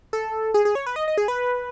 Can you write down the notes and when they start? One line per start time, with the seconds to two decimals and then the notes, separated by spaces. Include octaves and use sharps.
0.13 A4
0.54 G#4
0.65 G#4
0.75 C#5
0.86 B4
0.96 D#5
1.08 D#5
1.18 G#4
1.28 B4